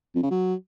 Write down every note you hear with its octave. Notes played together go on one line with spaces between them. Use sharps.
F2
C#3
F#3